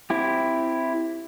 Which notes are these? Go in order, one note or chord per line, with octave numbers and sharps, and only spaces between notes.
C4 E4 G4